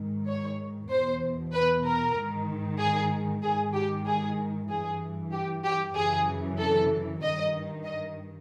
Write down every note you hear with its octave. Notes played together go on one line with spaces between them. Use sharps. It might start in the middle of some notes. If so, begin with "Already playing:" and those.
Already playing: G#2 D#3
C#5
E2 B2 C5
B4
A#4
G#2 D#3
G#4
G#2 D#3 G#4
G4
G#4
G2 E3 G#4
G4
G4
F#2 C#3 E3 G#4
A4
G2 D#3 D#5
D#5